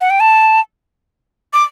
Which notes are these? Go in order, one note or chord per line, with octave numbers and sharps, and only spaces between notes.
F#5
G5
A5
D6